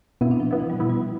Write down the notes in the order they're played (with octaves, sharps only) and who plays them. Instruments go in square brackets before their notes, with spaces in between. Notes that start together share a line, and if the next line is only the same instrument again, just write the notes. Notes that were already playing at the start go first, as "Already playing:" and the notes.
[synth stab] B2 B3 E4 [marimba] C4
[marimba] D4
F3
[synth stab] B2 B3 E4 [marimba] F3
[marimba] E3
G3
[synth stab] B2 B3 E4
[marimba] G3